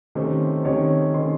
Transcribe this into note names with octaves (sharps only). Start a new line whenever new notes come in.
C3 D#3 A3 C4 C#4 C5
C3 D#3 A3 C#4 C#5
C3 D#3 A3 C#4 C5 C6